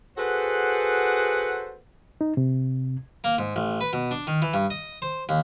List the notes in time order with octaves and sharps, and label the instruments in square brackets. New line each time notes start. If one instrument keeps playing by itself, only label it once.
[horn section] F#4 G#4 A4 B4 C5 F#5
[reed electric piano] D#4
C3
[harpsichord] A#3
G#2
A1
B4
B2
D4
D#3
E3
G2
D#5
C5
D#2